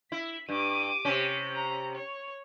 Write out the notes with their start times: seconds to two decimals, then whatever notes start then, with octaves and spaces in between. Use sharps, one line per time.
0.12 E4 B6
0.49 G2 D6 D#7
1.05 C3 C#4
1.54 A#5
1.95 C#5